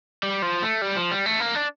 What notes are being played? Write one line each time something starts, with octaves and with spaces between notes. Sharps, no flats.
G3
F3
A3
G3
F3
G3
A3
A#3
D4